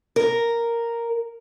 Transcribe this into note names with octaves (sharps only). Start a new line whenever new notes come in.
A#4